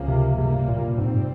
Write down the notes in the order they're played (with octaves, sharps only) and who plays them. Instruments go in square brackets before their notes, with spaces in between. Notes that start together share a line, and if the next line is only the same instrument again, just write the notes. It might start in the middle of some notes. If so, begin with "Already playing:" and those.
Already playing: [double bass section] C#2 C#3 F3 A#3
[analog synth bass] C3
[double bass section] G2 G3 A#3 [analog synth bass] C3
[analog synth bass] A#2
[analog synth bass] G#2 [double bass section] C3 G3 C4